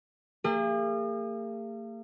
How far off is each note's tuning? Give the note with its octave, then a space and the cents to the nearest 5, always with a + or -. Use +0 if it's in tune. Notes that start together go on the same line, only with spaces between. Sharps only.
A#3 -45 G#4 -45